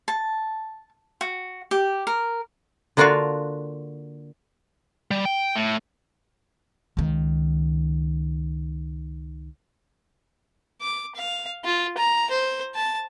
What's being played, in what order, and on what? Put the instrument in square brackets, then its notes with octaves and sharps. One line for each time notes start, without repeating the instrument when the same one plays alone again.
[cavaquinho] A5
F#4
G4
A#4
[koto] D3 A#3 D4 F4 F#4 F5
[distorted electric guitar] G3
G5
A2
[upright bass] C#2 D#3
[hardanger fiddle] D6
F5
F4
A#5
C5
A5